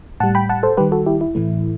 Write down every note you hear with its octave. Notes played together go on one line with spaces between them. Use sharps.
A2 G3 F#5 A5
G5 B5
F#5 A5
A4 C5
D#3 G3 G4 B4
F#4 A4
E4 G4
E4
A2 E3 A3